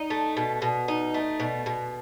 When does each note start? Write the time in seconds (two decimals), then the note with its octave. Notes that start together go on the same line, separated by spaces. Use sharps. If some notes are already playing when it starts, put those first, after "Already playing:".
Already playing: D#4
0.10 A3
0.37 B2
0.62 B2
0.88 D#4
1.14 A3
1.40 B2
1.66 B2